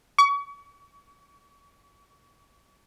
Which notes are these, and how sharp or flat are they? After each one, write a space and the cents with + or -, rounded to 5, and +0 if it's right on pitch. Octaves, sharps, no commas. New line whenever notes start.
C#6 +35